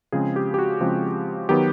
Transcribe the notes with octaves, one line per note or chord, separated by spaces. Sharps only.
C#3 F3 G#3 C4 G#4
G4
G4
F#4
C#3 F3 G#3 C4
D#3 F#3 B3 G4